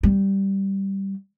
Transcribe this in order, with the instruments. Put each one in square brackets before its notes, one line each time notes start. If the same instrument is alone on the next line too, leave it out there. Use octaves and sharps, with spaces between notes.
[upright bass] G3